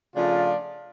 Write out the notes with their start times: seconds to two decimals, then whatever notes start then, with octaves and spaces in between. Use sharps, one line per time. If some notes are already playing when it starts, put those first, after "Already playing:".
0.15 C#3 F3 A3 D4 F4